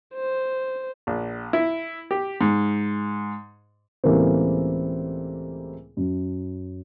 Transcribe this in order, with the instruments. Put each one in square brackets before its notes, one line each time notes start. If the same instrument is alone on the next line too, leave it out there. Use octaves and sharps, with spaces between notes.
[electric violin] C5
[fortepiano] A#1
E4
G4
G#2
[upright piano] C#2 A2 E3 G3 A#3 C4
F#2